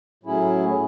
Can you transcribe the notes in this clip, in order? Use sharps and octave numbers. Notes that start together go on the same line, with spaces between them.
A2 F#3 C#4 E4 G#4